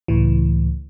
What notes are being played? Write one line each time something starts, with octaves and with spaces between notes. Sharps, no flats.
C#2 A2 E3